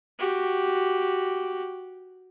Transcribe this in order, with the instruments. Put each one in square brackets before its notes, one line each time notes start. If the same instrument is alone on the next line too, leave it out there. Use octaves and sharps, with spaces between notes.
[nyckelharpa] F#4 G4